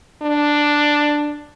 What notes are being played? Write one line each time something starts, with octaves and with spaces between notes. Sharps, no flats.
D4